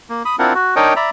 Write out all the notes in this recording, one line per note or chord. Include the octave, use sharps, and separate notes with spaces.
A#3
B5 D#6
C4 D4 E4 F4 A#4 F#5
F#4
D4 D#4 A#4 C#5 D#5 G5
D5 E5 A#5 B5